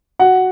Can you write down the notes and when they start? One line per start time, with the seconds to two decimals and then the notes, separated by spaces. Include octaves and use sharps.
0.19 F#4 F#5